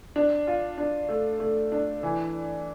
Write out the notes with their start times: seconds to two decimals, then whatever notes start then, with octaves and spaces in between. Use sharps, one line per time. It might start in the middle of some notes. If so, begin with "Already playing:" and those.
0.16 D4
0.47 F4
0.78 D4
1.09 A3
1.40 A3
1.72 D4
2.03 E3